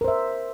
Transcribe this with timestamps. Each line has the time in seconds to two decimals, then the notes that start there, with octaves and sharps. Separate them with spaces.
0.01 A#4
0.04 C5
0.08 E5